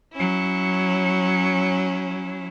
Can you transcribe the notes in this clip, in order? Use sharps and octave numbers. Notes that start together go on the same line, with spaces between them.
F#3 C#4 E4